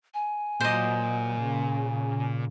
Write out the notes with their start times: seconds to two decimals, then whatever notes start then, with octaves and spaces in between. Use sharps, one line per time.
0.14 G#5
0.60 A#2 F#3 C5 D#5
1.37 C#3